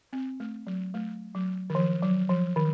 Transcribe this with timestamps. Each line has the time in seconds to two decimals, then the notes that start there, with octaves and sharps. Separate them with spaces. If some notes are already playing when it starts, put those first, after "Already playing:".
0.13 C4
0.40 A3
0.67 F#3
0.94 A3
1.35 F#3
1.70 D#3
1.75 F3
2.02 F#3
2.29 F3
2.56 D#3